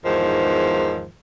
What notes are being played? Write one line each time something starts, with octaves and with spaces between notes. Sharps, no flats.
E2 G#2 D#3 F3